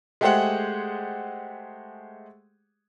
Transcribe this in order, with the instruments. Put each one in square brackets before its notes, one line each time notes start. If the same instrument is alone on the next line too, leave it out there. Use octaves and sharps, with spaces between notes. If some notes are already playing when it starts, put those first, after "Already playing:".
[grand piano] G#3 A3 G4 G#4 C5 F#5